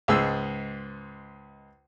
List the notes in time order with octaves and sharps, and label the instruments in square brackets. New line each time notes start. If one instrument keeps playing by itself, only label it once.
[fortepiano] C#2 G#2 G#4 E6